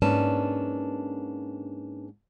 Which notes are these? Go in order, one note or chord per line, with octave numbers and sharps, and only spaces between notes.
G#2 A#3 C#4 D4 B4 A5